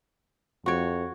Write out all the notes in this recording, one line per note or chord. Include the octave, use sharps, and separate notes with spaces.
F2 F#4 C#5